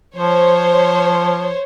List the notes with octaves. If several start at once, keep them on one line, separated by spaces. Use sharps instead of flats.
F3 C5 C#5